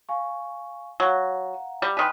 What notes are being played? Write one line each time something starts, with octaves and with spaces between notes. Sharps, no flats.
F5 G#5 C#6
F#3 F5 F#5 A#5
G3
D#3 B4 G#5 C6